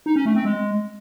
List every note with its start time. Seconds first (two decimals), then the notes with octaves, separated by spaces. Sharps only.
0.06 D#4
0.16 C#4
0.26 A3
0.35 C4
0.45 G#3